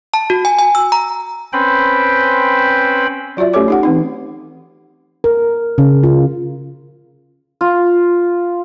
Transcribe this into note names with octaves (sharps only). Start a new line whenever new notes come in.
A5
F#4
G#5
G#5
E6
A#5
C4 C#4 B4 C5 G5 B5
F#3 F4 F#4 D5 E5
A3 C#4 G4 A4 C#5 D6
D#4 G4 F#5
E3 C4 D#4
A#4
C#3
F4
F4